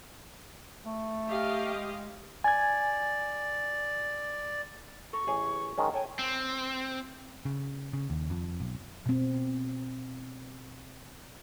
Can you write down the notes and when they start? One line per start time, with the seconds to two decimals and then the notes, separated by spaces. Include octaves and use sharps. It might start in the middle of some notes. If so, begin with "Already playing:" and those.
0.86 A3
1.28 G4 D#5 F5
1.75 G#3
2.44 D5 G#5 G#6
5.13 A4 A#5 C#6
5.27 A1 G#4 C#5
5.78 D#3 G#3 C#4
5.94 A4 C#5 G5 G#5
6.19 C4
7.45 C#3
7.93 C#3
8.10 D#2
8.30 F2
8.60 B1
9.06 B2 C4